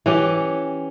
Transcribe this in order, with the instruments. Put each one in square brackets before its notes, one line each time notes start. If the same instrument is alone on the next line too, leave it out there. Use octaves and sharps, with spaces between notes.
[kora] E3 C#4 G4